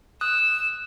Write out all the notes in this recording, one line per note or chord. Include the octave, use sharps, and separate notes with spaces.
D#6 E6 F#6